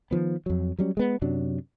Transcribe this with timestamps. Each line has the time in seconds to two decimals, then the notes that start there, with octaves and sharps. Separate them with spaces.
0.11 D#3 F3 B3
0.46 F2 F#3
0.79 F#3 G3 C#4
0.97 G#3 B3
1.22 F#2 C3 F#3 D4